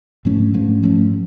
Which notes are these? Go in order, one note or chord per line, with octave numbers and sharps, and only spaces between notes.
G#2 F3 A3 C#4
G#2 F3 A3 C#4
G#2 F3 A3 C#4